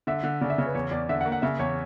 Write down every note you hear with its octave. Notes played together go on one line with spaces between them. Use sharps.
D3 E5
D3
C#3 D5
E5
C#3 C#5
B4
E2 C#5
E2 D5
D3 E5
F#5
A#3
F#5
C#3 E5
E2 C#5